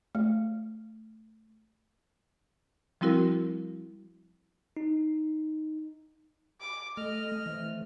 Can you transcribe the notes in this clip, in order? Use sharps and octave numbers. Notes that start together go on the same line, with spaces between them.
A3
F3 G3 C4 E4 F#4 A#4
D#4
D6
A3 A4 D#5 F6
E3 A3 C4